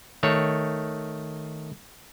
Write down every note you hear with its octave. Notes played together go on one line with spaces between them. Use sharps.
D#3 A3 C#5